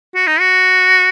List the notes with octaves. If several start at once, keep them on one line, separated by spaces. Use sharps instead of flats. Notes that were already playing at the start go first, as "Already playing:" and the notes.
F#4
D#4
F#4